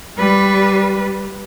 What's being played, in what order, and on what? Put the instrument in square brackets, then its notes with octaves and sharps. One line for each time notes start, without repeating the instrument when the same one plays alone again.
[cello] G3 B4